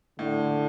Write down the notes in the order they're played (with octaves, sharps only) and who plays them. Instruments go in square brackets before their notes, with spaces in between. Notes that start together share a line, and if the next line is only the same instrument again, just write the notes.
[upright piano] A2 [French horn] D3